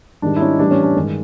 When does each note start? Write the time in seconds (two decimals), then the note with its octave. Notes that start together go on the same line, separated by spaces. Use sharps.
0.22 G#2 D#3 G3 D4
0.36 E4
0.40 C#4 D#4
0.59 A2 E3 G3 D4
0.71 C#4
0.83 D4
0.96 G2 D#3 G#3